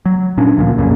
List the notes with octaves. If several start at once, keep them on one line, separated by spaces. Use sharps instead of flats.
F#3
A#2 C#4 D4
D2 A#2 F3
C2 F#2 A#2 C#3